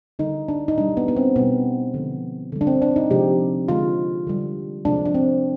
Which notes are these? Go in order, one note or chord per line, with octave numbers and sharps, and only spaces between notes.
D3 G3 D#4
D4
D#4
B2 G3 D4
B3
B3
C4
B2 G3 B3
D3 F3 G#3
D3 G3
D4
C4
D4
D#4
C3 F3 G#3 G4
D3 G#3 F4
D3 G3
C3 F3 G#3 D4
D4
C4